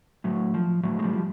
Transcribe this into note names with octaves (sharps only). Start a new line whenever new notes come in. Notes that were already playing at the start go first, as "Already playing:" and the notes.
A2 F#3
F3
A2 F#3
G#3
F3 G3
F3